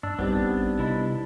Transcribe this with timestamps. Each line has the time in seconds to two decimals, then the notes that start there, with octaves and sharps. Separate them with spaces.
0.03 G2 D4 E6
0.19 A#1 G3 B3 C4 D4 D#4 G4
0.44 A1
0.79 C3 E4 D#5 B5